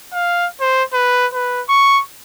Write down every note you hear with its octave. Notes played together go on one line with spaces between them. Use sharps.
F5
C5
B4
B4
C#6